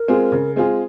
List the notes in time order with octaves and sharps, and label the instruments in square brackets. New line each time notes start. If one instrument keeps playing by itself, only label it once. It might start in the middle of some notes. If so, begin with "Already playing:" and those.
Already playing: [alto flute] A#4
[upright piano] G#3 C4 F4 G#4
C#3
G#3 C4 F4 G#4